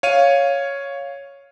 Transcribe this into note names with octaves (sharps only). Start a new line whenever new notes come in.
C#5 F5 D#7